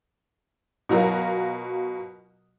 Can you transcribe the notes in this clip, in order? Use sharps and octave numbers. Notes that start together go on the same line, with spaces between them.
B2 F#3 F4 F#4 A#4